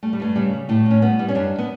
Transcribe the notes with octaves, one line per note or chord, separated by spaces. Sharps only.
G3 A3
G3
G2 A3
C#3 G3
G3
A2 A3
A2 C#4
G3 B3
G3
C#4
F#2 D4
B3